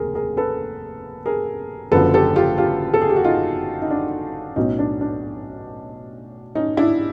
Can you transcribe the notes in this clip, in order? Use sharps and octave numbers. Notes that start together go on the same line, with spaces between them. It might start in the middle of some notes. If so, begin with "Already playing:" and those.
Already playing: F1 D#2 C#3 G#4 A#4
G#4 A#4
A4 B4
G#4 A#4
F#1 F#2 D3 F3 A4 B4
G4 A4
F4 G4
F4 G4
A4
G#4
G4
F#4
D#4 F4
D#4
D4
B1 A2 F#3 B3 C#4 D#4
D4
D4
C#4 D#4
D4 E4